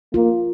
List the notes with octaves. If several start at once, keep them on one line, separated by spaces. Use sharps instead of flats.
A#3 F4